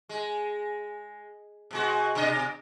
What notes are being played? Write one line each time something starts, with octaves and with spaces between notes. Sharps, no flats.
G#3
B2 G#3 F#4
B2 D4 D#5